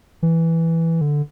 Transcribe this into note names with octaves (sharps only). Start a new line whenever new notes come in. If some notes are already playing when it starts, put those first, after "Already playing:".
E3
D3